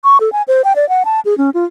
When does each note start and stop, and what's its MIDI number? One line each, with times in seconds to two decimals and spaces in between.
0.04 0.18 85
0.20 0.32 69
0.32 0.42 80
0.48 0.62 72
0.64 0.73 79
0.76 0.88 74
0.89 1.03 78
1.05 1.20 81
1.25 1.37 68
1.38 1.50 61
1.54 1.65 65